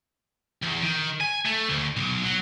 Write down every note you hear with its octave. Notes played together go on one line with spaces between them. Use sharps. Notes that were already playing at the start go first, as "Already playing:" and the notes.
E2
D#3
G#5
A3
D2
B1
F#3